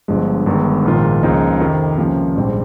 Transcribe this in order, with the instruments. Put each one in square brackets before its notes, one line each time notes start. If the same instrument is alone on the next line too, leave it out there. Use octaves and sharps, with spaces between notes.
[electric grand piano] G1 G2 F3 G#3
G1 G2 D#3 G#3
A#1 G#2 D#3 A#3 F4
C#2 C#3 F3 A#3 D#4
F2 C3 D#3
C#2 C3 F3 A#3 C#4
A#1 G#2 G3 C4